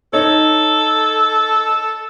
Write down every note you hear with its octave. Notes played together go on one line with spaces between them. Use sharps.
D#4 A4 C#5